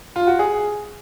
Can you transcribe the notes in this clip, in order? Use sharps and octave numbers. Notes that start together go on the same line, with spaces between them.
F4
F#4
G#4